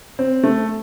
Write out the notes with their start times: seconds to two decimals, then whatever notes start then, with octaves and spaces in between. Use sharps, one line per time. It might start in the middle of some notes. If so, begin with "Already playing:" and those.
0.19 C4
0.44 A3